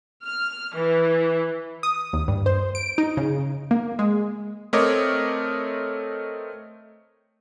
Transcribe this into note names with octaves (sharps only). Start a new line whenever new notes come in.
F6
E3
D#6
D#2
G2
C5
D7
D#4
C#3
A#3
G#3
A3 C4 A#4 C#5 D#5 D6